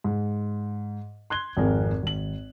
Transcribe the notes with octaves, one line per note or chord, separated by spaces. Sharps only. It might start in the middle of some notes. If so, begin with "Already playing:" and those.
G#2
C6 F#6 G#6 G7
G#1 F2 G#4 A#4
G#1 F#7